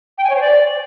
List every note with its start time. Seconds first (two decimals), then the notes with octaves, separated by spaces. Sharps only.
0.18 G5
0.24 G#5
0.30 C#5
0.36 C5
0.41 D5